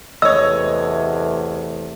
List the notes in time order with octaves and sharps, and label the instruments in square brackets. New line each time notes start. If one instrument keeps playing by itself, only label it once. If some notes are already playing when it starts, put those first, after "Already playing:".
[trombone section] E2 C3 A3 [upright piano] C#5 D#5 [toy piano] E6